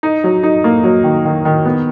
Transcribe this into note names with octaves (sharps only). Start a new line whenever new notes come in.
D#4
F#3
D#4
A#3
F#3
D#3
D#3
D#3
B3